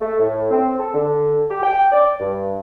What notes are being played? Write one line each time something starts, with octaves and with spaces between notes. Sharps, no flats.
A3
A2
C4
A4
D3
G4
G5
D5
G2